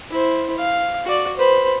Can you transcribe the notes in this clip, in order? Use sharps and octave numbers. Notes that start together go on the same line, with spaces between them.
E4 C5
F5
F#4 D5
B4 C5